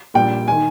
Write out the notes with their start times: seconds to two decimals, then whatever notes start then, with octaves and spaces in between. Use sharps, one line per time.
0.14 A#1 A#2 G3 G5
0.48 D#3 G#5